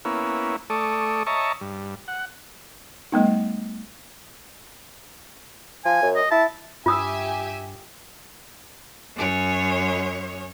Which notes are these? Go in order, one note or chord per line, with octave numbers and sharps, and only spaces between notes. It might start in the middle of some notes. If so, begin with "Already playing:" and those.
A#3 B3 C#4 E4
A3 A4 D5 C#6 D#6
C#5 D#5 E5 A5 A#5 C#6
G2
F#5
G3 A3 B3 D#4
F3 G#5
F#2
D#5
E4 A5
G2 F4 G4 E5 G#5 D#6 E6
F#2 C#5